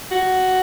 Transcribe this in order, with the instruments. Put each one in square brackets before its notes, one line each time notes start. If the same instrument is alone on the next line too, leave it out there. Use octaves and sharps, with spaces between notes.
[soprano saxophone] F#4